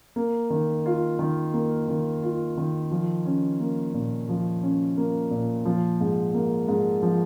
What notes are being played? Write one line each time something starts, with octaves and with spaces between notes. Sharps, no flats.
A#3
D#3
F4
D#3
A#3
D#3
F4
D#3
F3
C#4
A#3
A#2
F3
C#4
A#3
A#2
F3
G#2
A#3
G#2
F3